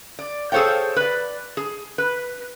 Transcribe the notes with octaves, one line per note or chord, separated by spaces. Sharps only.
D5
G#4 A4 C5 C#5 F5 G5
B4 D5
G#4
B4